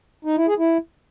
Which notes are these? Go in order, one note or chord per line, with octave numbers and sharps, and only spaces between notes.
D#4
E4
G#4
E4